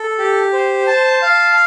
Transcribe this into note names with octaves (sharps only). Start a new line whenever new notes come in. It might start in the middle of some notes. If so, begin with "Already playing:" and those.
Already playing: A4
G4
C5
A5
F5